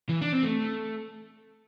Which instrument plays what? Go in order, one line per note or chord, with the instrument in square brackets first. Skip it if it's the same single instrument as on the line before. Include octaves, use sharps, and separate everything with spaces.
[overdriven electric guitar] E3
D4
C4
A3